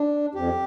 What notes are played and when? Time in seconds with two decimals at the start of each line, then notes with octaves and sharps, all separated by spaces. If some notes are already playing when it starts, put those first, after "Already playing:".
Already playing: D4
0.35 F2 G4